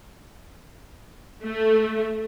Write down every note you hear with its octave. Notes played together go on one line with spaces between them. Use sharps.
A3